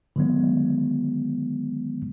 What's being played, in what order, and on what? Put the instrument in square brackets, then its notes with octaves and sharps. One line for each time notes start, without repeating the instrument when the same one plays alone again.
[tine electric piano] D3 D#3 F#3 G#3 B3